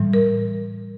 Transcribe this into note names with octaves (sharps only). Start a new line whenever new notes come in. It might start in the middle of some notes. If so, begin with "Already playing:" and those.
Already playing: A2 E3 G3
A#4